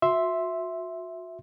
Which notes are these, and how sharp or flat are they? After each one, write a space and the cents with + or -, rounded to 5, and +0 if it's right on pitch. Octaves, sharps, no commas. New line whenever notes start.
F#4 -30 E5 +0 C6 +0